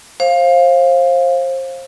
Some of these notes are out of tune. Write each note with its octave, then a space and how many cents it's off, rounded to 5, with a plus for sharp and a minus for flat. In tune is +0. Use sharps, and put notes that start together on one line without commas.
C5 +30 F5 +0